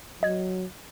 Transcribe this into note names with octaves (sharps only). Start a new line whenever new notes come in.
F#3 D#5 G#6